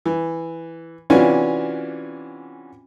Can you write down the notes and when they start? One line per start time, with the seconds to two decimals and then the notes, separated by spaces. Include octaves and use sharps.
0.06 E3
1.10 C3 E3 C#4 D4 F4 F#4